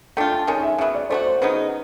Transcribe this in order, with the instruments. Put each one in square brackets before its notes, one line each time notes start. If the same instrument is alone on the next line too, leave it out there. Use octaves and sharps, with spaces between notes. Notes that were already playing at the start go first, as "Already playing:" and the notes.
[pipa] A3 D4 F4 [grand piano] G5
[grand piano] A5
[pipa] D#3 G#3 C#4 [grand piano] G#5
[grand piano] E5
[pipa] C#3 F#3 B3 [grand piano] E5
[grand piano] D5
[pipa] A3 D4 F#4 [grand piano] C5
[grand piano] C5
[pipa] C#3 F#3 B3 D#4 [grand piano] B4